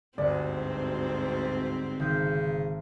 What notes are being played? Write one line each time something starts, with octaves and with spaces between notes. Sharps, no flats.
G1 D2 G#2 B2 C4 D5 F#5
G#1 C#3 G6